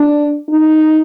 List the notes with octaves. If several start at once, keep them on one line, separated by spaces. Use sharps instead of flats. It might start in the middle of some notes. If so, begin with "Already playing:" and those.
Already playing: D4
D#4